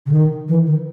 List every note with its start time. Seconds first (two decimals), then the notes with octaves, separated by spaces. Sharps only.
0.06 C#3
0.11 D#3
0.48 E3
0.66 D#3